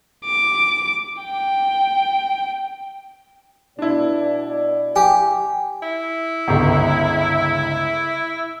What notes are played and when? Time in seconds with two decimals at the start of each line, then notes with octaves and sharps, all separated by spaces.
0.25 D6
1.22 G5
3.79 B2 D4 E4 D5
4.96 G4 G#5
5.82 E4
6.48 G1 C#2